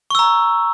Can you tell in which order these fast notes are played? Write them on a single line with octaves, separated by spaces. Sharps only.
C#6 E6 A#5